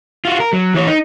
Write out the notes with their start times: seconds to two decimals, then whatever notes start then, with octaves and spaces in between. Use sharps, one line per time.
0.25 F4 F#4
0.40 A#4
0.53 F#3
0.74 E3 C#5
0.88 D#4